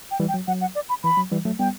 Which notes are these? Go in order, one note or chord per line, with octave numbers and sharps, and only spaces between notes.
G5
E3 G3
G5
F#3
F#3 F#5
F#5
D5
B5
E3 B5
F#3
E3 G3
F#3 A3
G3 B3 G5